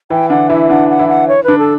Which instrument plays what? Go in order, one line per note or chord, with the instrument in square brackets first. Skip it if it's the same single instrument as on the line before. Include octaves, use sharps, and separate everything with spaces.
[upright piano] E3 E4 [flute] G5
[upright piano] D3 D4 [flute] F#5
[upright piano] E3 E4 [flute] E5
[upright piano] D3 D4 [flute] F#5
[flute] F#5
[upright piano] E3 E4
[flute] F#5
C#5
[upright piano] D3 D4 [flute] B4
[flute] A4